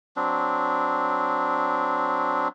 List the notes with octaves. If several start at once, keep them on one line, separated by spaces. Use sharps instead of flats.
F#3 C4 D4